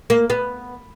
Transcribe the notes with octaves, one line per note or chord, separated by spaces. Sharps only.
A#3
B3